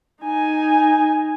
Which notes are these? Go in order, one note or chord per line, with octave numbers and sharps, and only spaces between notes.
D#4 G#5